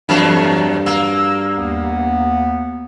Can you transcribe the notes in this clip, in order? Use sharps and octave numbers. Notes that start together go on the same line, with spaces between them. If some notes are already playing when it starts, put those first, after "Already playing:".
E2 G2 F#3 A3
A#3 E6
D#2 B3